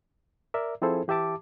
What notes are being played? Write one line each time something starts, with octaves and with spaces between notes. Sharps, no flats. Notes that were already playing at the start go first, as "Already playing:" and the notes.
A#4 D5 E5
F3 C4 E4 G#4 A4 C5
E3 G4 E5 A5 D6